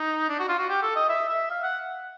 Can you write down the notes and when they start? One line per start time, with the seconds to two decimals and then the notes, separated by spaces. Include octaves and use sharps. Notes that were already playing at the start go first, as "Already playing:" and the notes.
Already playing: D#4
0.29 D4
0.39 F#4
0.49 F4
0.59 F#4
0.69 G4
0.82 A4
0.96 D#5
1.09 E5
1.29 E5
1.50 F5
1.63 F#5